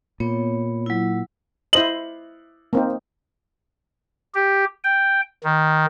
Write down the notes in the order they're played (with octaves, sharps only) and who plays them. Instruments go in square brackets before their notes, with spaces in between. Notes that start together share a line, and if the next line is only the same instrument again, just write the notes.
[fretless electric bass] A#2 [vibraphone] B3 C#5
[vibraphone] F#3 E4
[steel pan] E4 C5 D#5 [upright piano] F#7
[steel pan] A#3 C4 D#4
[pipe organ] G4
G5
D#3